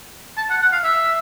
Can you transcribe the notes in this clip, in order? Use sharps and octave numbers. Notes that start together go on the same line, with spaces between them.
A5
F#5
F#5
F5
E5